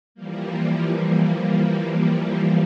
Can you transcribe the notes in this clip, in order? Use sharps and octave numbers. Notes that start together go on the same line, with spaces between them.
E3 F3 G3 A#3